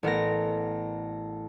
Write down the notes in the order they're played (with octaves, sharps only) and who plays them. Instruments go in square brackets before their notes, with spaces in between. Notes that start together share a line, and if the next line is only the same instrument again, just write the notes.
[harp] A1 B3 A#4 A#6